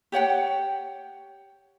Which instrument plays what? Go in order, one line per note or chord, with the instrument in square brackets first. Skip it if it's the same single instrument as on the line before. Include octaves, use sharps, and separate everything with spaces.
[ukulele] G4 C#5 F#5 G5